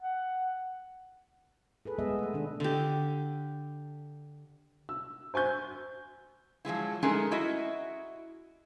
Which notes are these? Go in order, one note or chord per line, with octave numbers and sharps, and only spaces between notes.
F#5
G#4 A4 B4
G#3 B3 G#4 D#5 E5
A3 B4
B2 D#3 D4
D3 G4
E6
C5 G#5 C#6 G6
F3 F#3 G#3 E4
G#3 A3 C#4 D#4 G#4 A#4
E4 F#4 D#5 E5